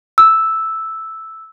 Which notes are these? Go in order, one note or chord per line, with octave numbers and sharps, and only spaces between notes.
E6